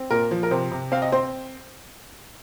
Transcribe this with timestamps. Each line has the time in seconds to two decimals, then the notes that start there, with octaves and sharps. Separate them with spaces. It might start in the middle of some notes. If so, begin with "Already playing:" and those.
Already playing: C4
0.10 A#2 A#4
0.31 F3
0.43 A#4
0.51 C3 C5
0.72 C3
0.92 C4 F5
1.02 D#5
1.12 C4 C5